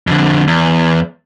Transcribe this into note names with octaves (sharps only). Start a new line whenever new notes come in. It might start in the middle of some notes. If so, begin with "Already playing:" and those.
F2 D3
E2